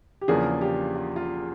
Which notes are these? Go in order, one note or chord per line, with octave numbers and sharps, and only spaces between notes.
G4
E2 C#3 F3 A#3 D4 G#4
G4
F4
F4